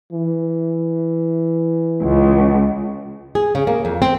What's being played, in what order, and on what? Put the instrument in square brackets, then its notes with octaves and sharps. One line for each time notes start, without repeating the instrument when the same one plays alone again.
[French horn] E3
[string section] C#2
[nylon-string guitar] G#4
C#3
A#3
F2
C4